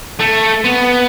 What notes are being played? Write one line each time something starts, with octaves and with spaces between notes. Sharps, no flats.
A3
B3